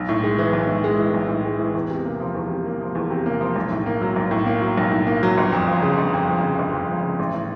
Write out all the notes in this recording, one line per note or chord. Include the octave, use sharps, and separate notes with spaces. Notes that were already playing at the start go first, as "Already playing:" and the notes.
Already playing: B1
A2
G#3
E3
B1
A2
G#3
E3
B1
A2
G#3
E3
E2
C3
A#3
F3
E2
C3
A#3
F3
E2
C3
A#3
F3
B1
A2
A#3
F#3
B1
A2
A#3
F#3
B1
A2
A#3
F#3
G1
F2
F3
C#3
G1
F2
F3
C#3
G1
F2
F3
C#3
A1
A2